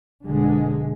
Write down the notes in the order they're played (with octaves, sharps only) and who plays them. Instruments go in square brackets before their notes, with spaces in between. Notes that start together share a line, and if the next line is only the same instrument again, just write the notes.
[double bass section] F1 B2 D3 G#3